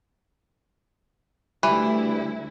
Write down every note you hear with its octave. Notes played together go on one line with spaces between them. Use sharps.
D2 E3 G3 E4 B5